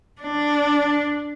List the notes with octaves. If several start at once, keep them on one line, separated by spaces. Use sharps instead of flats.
D4